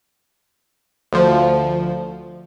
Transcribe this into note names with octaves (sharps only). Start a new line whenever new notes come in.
D2 F3